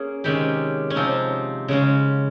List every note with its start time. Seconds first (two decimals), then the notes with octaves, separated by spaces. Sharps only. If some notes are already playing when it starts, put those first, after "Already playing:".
Already playing: A#3 C#4 G#4
0.24 C3 D#3 G#3 C#4 G4
0.90 C#4
0.96 C3 F3 C4 D#4
1.68 C#3 G#3 C#4